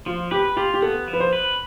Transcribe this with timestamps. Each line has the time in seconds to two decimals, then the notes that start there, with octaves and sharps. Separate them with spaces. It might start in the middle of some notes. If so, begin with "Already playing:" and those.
0.06 F3 F4
0.31 G4 B4
0.57 F4 G4
0.74 G4
0.82 B3 A4
1.08 F3
1.13 B4
1.20 C5
1.33 B4